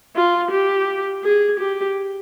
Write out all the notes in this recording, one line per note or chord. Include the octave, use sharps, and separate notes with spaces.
F4
G4
G#4
G4